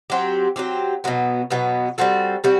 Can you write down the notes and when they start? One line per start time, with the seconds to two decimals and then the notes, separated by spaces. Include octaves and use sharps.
0.10 F#3 C4 G4
0.56 F#3 C4 G4
1.04 B2 F#3 B3
1.50 B2 F#3 B3
1.98 G3 C4 F#4 A4
2.44 G3 C4 F#4